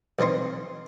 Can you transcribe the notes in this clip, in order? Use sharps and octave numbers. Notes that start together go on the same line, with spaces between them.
B1 E3 C4 D#4 C6